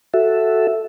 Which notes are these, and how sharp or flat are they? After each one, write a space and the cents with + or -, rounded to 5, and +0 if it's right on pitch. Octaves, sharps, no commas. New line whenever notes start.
F#4 +0 A4 +0 E5 +0